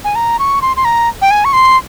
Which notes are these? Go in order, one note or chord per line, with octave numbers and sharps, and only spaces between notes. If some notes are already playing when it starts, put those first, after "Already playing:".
G#5
A#5
C#6
C6
C6
A#5
G5
G#5
C#6
C6